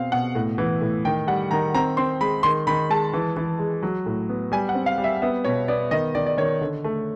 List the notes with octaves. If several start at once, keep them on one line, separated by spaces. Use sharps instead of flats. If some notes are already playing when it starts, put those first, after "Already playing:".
Already playing: B2 C4 F5
B2 F#5
A2
E3
A2
D#3 G5
G3 F#5
D#3 A#5
C4 A#5
C4 C6
G#3 B5
D#3 C6
D#3 B5
G#3 A5
E3
E3
G#3
F#3
A2
B3
G3 G#5
F#5
C4
F5
G3
E5
B3 E5
B2 C#5
B3 D5
D#3 D#5
D#3 D5
D5
D#3 C#5
D3
A3